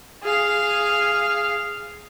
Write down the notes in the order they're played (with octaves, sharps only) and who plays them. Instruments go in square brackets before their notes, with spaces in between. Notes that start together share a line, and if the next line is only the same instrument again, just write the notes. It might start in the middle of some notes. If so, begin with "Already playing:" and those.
[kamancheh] G#4 F5